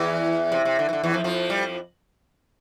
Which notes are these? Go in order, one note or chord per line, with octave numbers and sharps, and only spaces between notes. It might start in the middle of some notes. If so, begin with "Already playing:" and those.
Already playing: E2 E3
C3
C3
D3
E3
D3
E2 E3
F2 F3
F2 F3
G3